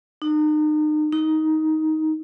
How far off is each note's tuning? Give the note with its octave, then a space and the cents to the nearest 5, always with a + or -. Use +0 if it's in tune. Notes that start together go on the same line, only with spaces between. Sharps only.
D#4 -35
D#4 +10